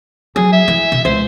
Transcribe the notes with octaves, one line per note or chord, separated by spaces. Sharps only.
F#3 G#4
E5
E3
B2
C#2 C5